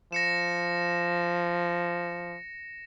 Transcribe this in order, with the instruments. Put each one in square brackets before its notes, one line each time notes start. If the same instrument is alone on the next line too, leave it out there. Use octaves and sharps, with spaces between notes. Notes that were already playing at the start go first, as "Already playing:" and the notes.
[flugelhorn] F3 [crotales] A#6 C#7 E7